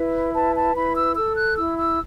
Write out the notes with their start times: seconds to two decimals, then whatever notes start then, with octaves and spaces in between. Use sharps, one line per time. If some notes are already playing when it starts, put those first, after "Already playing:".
Already playing: E4 B4
0.34 B4 A5
0.55 A5
0.75 E4 B5
0.95 E6
1.16 A4 E6
1.36 F#6
1.56 E4 E6
1.77 E6